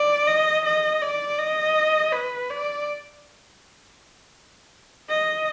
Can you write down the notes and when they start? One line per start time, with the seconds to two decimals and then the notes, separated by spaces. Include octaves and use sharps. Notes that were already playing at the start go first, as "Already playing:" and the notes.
Already playing: D5
0.28 D#5
0.65 D#5
1.02 D5
1.39 D#5
2.13 B4
2.50 D5
5.09 D#5